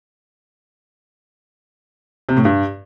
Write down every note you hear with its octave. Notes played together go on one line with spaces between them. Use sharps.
C3
A2
G2